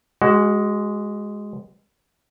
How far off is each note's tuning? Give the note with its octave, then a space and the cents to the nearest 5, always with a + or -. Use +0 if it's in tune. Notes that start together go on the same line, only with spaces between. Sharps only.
G#3 +0 F#4 +25